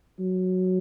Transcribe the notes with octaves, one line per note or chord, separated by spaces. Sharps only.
F#3